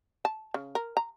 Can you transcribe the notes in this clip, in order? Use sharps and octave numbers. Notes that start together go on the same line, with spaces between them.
A5
C#3
A#4
A#5